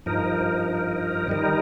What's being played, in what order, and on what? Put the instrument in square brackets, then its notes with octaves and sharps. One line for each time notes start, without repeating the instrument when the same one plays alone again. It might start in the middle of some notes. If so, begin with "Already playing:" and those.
[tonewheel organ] G2 F3 D#4 A#4
D#3 G3 D#4 A#4